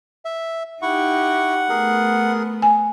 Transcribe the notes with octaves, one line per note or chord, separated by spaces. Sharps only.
E5
D#4 E4 G4 F#5 C#6
A3 B3 G#4 A#4
G#5